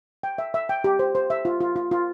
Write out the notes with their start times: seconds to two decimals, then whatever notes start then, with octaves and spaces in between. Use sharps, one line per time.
0.23 G5
0.38 E5
0.54 E5
0.69 G5
0.84 G4
0.99 C5
1.15 C5
1.30 E5
1.45 F4
1.60 F4
1.76 F4
1.91 F4